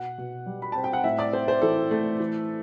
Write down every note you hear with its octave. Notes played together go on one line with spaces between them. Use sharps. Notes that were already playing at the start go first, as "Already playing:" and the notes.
Already playing: B2 F#5
B2
G3
B5
C4 A5
G5
F#5
A2 E5
D5
C4 C5
C5
E3 A4
A3
E3